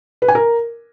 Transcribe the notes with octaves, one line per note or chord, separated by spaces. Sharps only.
B4
G#5
A#4